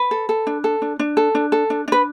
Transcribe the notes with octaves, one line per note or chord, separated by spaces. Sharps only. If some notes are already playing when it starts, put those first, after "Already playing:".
Already playing: B4
A4
A4
D4
A4
D4
D4
A4
D4
A4
D4
D4 B4